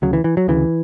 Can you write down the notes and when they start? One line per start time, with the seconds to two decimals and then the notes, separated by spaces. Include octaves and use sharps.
0.02 D2 C#3 F#3
0.13 E3
0.24 E3
0.37 F#3
0.48 D2 C#3 E3